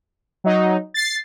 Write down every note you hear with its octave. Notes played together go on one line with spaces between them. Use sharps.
F#3 D#4
A6 C7